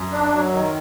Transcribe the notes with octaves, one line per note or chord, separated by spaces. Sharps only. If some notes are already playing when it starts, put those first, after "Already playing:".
Already playing: F#2
D4
F#3
D#3